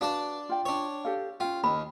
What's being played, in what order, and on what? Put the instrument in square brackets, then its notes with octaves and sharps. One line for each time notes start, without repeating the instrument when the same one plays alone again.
[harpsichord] D4 D5 A5 [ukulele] F#4 B4 F5
[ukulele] F4 G5
[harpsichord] D4 C#5
[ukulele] G4 A4 F5
[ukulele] C#4 G5 [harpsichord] F4
[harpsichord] D#2 [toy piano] B5